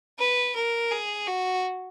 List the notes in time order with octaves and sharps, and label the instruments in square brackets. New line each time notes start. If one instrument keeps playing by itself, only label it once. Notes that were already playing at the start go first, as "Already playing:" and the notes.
[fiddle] B4
A#4
G#4
F#4